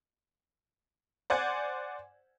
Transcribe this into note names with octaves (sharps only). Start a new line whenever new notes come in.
C5 D5 F#5 G#5 G#6